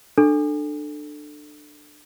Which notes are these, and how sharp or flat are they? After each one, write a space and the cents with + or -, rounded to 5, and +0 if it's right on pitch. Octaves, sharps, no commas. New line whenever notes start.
D4 +25 A4 +0